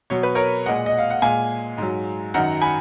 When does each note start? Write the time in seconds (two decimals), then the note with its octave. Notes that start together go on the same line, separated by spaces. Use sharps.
0.10 B2 F#3 C#5
0.23 B4
0.35 A#4 C#5
0.66 A#2 G#3 D#5 F#5
0.86 D#5
0.98 F5
1.10 F#5
1.22 A#2 G#3 F5 G#5
1.78 G#2 F#3
2.34 F#2 D#3 F#3 F#5 A#5
2.62 G#5 B5